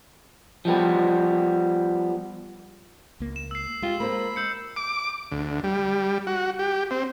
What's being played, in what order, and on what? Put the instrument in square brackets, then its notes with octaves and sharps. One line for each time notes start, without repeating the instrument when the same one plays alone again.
[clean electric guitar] F3 G3 B3
[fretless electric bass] C#2 A#3
[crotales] E7
E6 C7
[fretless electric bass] G#3 [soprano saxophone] F4 [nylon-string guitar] G4
[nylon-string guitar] A#3 C5 [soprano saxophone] B5
[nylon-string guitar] D#4 [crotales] E6 G6 C#7
[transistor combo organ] D6
D2
G3
F#4
G4
C4